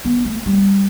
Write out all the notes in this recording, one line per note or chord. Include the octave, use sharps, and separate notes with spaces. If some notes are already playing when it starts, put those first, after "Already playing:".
B3
A3
G3